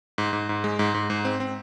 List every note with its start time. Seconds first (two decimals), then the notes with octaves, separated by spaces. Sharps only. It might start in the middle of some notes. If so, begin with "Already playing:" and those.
0.18 G#2
0.33 G#2
0.49 G#2
0.64 G#3
0.79 G#2
0.94 G#2
1.10 G#2
1.25 C4
1.40 C4